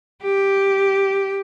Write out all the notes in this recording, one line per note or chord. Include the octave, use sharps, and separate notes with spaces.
G4